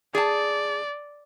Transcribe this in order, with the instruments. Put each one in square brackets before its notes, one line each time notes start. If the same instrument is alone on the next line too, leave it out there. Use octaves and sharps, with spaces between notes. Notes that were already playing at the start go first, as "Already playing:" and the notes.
[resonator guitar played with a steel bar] G#4 A5 [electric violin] D5